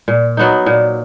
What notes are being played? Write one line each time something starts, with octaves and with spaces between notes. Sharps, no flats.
A#2
F#3 B3 D#4
A#2